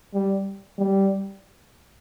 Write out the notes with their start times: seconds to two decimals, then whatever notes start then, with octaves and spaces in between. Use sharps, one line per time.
0.14 G3
0.78 G3